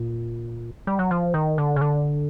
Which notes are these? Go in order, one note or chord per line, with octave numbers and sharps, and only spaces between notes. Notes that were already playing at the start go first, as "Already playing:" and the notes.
Already playing: A#2
G3
F#3
F3
D#3
D3
C#3
D3